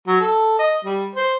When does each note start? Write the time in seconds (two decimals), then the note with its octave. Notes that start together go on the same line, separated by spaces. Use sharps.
0.07 F#3
0.21 A4
0.59 D#5
0.85 G3
1.16 C5